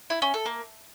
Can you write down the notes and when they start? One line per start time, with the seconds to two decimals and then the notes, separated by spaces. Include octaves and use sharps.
0.10 E4
0.22 C#4
0.34 A4
0.46 A#3